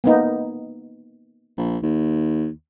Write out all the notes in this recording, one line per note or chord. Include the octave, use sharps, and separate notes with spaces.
A#3 B3 D#4
A#1
D#2